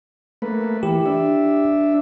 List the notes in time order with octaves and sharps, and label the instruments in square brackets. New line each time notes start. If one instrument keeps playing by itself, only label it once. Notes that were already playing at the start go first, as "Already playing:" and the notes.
[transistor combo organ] A3 A#3 B4
[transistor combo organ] E3 [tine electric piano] G4
[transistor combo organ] D4 E5